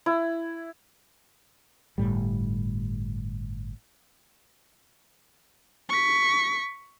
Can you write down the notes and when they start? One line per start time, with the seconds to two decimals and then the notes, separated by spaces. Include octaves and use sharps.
0.06 E4
1.98 G1 D#2 A2 G3
5.89 C#6 B6